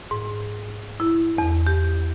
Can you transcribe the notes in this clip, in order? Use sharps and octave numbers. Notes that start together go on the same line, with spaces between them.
G#2
E4
E2
G4